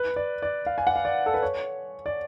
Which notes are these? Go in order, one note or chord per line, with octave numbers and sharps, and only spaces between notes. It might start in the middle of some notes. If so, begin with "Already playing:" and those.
Already playing: B4
D5
D5
F5
G#5
F#5
F5
D5
A4
B4
C#5
D5